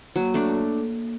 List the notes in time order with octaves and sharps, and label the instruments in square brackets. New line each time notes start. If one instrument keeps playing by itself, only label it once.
[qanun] F#3 [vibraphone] A#3
[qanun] A3 D4